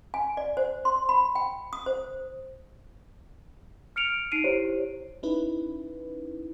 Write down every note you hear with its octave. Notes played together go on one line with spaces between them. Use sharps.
G#5
D5
C5
C6
B5
G5
D#6
C5
F6 C#7 D7 F7
D#4 C7 D7 D#7
E4 G4 C5 C#5
C#4 D#4 E4 B4